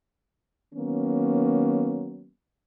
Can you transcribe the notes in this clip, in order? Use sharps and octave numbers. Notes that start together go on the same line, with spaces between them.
D#3 F#3 A#3 B3 C#4